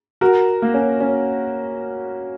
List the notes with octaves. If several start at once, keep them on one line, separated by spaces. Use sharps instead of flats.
F#4 A#4
A#3
C#4
C#4